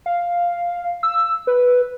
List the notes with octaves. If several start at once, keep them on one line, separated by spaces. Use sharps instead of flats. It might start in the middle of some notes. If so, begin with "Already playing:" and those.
F5
E6
B4